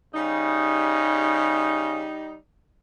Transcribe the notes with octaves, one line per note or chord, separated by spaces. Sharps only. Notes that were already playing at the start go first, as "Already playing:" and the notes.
C#3 G3 D#4